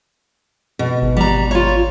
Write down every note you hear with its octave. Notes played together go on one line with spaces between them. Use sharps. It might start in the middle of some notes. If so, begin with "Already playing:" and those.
B2
G#1
G3 A#5
F4 C#5